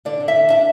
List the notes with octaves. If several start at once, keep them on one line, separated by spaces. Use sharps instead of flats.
D3 D5
D3
E5
D3
D4 E5